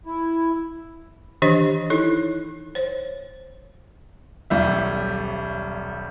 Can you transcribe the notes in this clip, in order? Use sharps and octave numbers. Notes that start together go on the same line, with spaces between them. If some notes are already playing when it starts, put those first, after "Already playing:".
E4
D#3 E3 D4 G4 C5 D#5
D#4 E4 A4 C#5
C5 C#5
D#1 B1 G3 E5